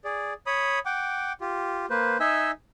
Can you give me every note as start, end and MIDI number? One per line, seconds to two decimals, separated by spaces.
0.04 0.33 68
0.04 0.33 74
0.47 0.79 73
0.47 0.79 83
0.47 0.79 87
0.86 1.33 78
0.86 1.33 79
0.86 1.33 86
1.41 1.86 65
1.41 1.86 67
1.90 2.18 58
1.90 2.18 71
1.90 2.18 72
2.20 2.51 63
2.20 2.51 75
2.20 2.51 76
2.20 2.51 80
2.20 2.51 88